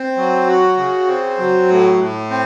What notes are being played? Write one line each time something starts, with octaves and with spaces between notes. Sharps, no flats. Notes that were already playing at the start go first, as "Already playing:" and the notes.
Already playing: C4
F#3
F#4
C#3
C4
F#3
A2
A2
C4